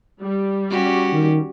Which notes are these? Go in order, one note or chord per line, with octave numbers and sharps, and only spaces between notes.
G3
C#4 F#4 G4
D#3